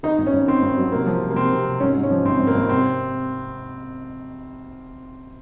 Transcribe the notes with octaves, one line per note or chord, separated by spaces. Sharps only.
D#3 D#4
G#1
C#4
G#1
D#3 C4
G#1
F#3
C3 A#3
F3
C3
A#3
C3 C4
C3
C3
G#2 C#4
G#2
C#4
F3
G#1 C4
G#1
A#3
G#1
C3 C4